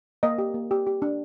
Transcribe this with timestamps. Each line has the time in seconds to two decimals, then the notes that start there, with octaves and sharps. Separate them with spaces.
0.23 A#3 D#5
0.38 G4
0.54 A#3
0.71 G4
0.87 G4
1.02 D4